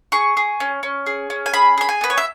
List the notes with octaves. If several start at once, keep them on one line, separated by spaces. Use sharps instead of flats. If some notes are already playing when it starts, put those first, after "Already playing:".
G#4 C#6
G#4
C#4
C#4
G#4
C#4
G#5
G#4 B5
G#4 B5
G#5
B3 B4
C#5
E5